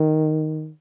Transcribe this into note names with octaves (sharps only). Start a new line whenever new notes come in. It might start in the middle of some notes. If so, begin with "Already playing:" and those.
Already playing: D#3